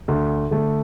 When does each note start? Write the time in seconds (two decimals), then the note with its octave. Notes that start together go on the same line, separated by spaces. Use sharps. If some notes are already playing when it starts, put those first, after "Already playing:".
0.08 D2
0.51 D3 A3